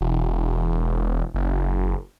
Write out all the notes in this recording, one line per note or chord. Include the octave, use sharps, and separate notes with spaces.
E1
F#1